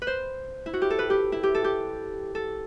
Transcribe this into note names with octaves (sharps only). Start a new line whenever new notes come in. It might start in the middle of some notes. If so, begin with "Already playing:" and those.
B4
C5
E4
F#4
G4
A4
B4
G4
E4
G4
A4
G4
A4